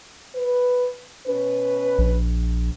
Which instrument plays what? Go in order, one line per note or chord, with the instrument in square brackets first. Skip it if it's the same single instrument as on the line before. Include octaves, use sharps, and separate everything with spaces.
[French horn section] B4
B2 C#4 B4
[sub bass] A#1